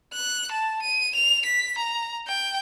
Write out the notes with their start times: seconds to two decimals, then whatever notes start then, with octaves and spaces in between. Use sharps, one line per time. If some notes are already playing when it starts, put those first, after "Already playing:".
0.14 F#6
0.52 A5
0.82 D#7
1.15 F7
1.45 B6
1.78 A#5
2.27 G5